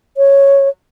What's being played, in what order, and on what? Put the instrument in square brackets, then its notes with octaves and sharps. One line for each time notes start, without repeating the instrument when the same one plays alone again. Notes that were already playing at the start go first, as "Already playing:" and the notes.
[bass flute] C#5